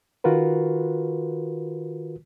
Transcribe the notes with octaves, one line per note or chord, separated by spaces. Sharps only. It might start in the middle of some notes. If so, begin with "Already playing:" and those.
D#3 F4 F#4 A#4 B4